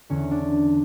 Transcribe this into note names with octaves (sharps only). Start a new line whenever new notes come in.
E2 D3 C#4
D4